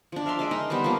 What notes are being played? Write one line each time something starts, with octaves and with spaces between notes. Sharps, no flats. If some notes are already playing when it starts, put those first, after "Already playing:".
F3 D4
A#4 E5 F5 C6
G#3 D#5 E5 D6
D#4 A#4 D#5
G3 B3 B4 C5
F3 A#3 C#4